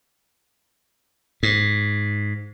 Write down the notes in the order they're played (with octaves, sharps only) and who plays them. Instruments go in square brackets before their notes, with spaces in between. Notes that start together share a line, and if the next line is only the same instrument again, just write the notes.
[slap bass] G#2